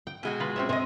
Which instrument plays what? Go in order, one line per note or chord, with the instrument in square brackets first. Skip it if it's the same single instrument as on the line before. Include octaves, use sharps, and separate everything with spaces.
[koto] G5
[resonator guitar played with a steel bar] B2 G#3 F#4
[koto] F4 B4
C4 C#4 E5
[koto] C3 G#5 [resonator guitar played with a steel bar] C5 D#5